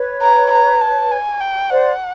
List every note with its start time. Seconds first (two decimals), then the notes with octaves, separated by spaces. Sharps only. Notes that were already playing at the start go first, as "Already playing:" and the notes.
Already playing: B4 C#5
0.22 A#5
0.51 A#5
0.81 A5
1.11 G#5
1.40 G5
1.70 C5 D5 F#5